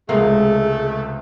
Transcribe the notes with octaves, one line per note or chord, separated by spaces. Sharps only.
C#2 C3 G#3 A3 G#4 A#4 F5